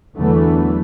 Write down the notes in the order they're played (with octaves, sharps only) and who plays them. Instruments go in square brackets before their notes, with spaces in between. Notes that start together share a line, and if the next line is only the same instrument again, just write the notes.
[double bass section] E2 D3 E3 F#3 A3 B3